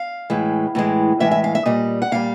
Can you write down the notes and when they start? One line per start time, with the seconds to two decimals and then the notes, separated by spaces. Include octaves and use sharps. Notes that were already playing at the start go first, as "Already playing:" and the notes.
Already playing: F5
0.30 A2 E3 G#3
0.75 A2 E3 G#3
1.20 A2 E3 G#3 E5
1.31 E5
1.44 F5
1.55 E5
1.66 A#2 G3 D#5
2.02 F#5
2.12 A#2 G3 F5